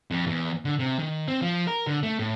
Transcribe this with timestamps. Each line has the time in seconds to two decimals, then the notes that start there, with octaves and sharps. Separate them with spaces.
0.11 F2
0.27 E2
0.65 D3
0.79 C3
0.99 D#3
1.28 C4
1.42 F3
1.67 A#4
1.87 D3
2.03 A3
2.19 A2